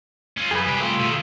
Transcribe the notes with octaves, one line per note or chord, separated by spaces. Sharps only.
C#4 F4
F#2 G#4 B4
C2 G4
A3 F4 E5
B2 D#3